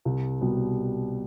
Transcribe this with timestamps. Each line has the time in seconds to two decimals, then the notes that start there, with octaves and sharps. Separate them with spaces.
0.05 C2
0.41 B2 G3 B3